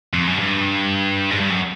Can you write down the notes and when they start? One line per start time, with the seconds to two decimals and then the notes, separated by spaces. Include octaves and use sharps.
0.13 F2
0.27 F#2
0.39 G2
1.31 G#2
1.41 G2
1.50 F#2